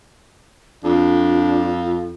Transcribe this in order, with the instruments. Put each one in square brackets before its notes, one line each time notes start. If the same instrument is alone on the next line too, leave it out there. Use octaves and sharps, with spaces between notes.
[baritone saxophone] F2 [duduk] D4 [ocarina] F4